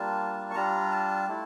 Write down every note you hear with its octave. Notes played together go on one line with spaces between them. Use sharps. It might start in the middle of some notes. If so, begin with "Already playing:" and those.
Already playing: G3 A#3 D4 F4 A5
C#6
G3 D4 F4 A#5
A5
A3 E4